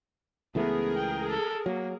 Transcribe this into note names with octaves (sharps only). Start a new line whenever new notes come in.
C#2 E3 A3 B3 G#4 A#4
G5
A4
F#3 A#3